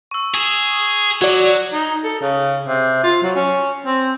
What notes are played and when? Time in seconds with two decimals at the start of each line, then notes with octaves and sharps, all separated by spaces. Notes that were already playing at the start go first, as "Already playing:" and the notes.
0.11 C#6 E6
0.34 G#4 D#6 E7 F7
1.22 F#3 F#4 D5 G#6
1.73 D#4
2.04 A4
2.21 C#3
2.68 C3
3.03 F4
3.23 F#3
3.36 C#4
3.86 C4